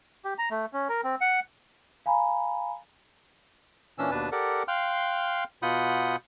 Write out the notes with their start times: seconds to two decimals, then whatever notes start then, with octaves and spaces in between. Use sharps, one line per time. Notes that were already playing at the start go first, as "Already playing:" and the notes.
0.25 G4
0.38 A#5
0.51 A3
0.73 C#4
0.89 A#4
1.04 C4
1.21 F#5
2.06 F5 G#5 A#5 B5
3.98 A#2 E3 C#4 D4 E6
4.11 D#2 B2 D4 B4 A5
4.32 G4 A4 A#4 D5 F#5
4.68 F5 G5 C6 F6 F#6
5.62 B2 F4 F#5 B5 D#6 G6